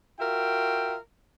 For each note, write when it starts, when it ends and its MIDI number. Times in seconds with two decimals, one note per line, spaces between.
0.19 0.96 65
0.19 0.96 66
0.19 0.96 70
0.19 0.96 76
0.19 0.96 79